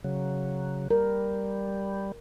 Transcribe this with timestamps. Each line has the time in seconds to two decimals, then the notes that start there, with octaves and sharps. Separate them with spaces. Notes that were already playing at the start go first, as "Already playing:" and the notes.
0.04 C#3 F#3
0.91 G3 A#4